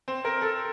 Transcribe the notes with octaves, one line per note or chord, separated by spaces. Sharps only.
C4
A#4
A4